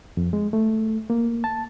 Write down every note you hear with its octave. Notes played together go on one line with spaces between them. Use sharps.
F2
G#3
A3
A#3
A5